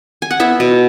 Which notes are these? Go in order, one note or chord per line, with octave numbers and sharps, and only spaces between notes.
G#5
F#5
B3 E4 E5
B2